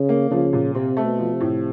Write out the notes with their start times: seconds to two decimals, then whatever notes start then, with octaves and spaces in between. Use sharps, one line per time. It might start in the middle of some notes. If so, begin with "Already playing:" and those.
Already playing: C#3
0.09 A#3
0.31 C#3 F3
0.53 A#2
0.75 C3 C4
0.97 A3
1.04 B2
1.19 F3
1.34 C3
1.41 A2